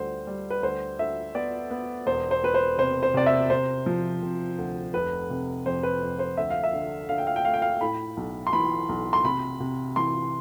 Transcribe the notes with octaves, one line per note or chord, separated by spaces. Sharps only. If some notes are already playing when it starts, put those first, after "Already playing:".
Already playing: D2 G3 C5
G3
B4
D2 C5
D2 E5
B3 D5
B3
E1 C5
C5
E1 B4
C5
C3 C5
C5
C3 D5
E5
C3 C5
F3
C3
D2
F1 B4
C3
F2 C5
B4
F2
C5
D2 E5
F5
E5
D3
D3 F5
G5
F5
G5
A3 F5
G5
F5
A2 B5
B1
C6
E3 B5
B1
C6
C3 B5
C3
E3 C6